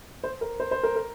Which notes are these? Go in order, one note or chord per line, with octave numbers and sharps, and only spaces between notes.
C5
A#4
C5
C5
A#4
A#4